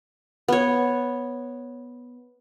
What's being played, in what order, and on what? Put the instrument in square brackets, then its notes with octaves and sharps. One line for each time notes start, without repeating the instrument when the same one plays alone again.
[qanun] B3 C#5